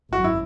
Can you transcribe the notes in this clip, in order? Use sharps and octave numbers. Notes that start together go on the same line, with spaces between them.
G#1 F#2 F#4
E4